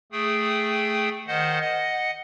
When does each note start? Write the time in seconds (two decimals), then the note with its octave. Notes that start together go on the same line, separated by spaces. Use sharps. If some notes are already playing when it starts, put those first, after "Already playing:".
0.12 A3 G#4 G5 D#6
1.27 D#3 C5 D#5 F#5
1.61 D#5 F#5